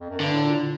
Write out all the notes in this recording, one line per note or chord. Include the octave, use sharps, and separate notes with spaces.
F2
F#2
G2 D3
A2
A#2